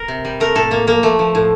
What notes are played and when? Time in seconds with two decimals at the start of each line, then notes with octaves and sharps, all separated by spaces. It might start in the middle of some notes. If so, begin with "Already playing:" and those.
Already playing: A#4
0.08 C3
0.25 G3
0.40 A3 A#4
0.55 A2 A4
0.71 A2 A#3
0.87 F3 A#3
1.03 F3 A3
1.19 F3
1.35 A2